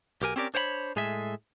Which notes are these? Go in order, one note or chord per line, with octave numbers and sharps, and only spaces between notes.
B1 G4 A#4 G#5
C4 C#4 G4 A#4 D5
D4 C5 C#5 F#5 B5
A2 G#3 G#4 A4 E5